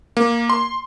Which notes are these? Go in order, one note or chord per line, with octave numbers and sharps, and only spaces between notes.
A#3
C6